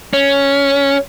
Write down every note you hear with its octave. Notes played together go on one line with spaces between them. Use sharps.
C#4